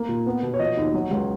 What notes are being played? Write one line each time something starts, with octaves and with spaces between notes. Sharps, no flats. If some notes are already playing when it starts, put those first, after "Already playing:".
Already playing: A#3
A#2
B3
B2
C#5
F3 D#5
D#2
F#3
C#2